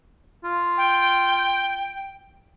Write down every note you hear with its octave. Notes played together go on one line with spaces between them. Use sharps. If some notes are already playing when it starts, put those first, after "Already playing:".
F4
G5